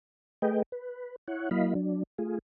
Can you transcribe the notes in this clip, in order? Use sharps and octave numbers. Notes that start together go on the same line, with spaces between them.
A3 G#4 B4 D#5 G5
B4
E4 C#5 F#5
F#3 A#3 E4 D#5 F5 B5
F#3 D4
A3 F4 G#4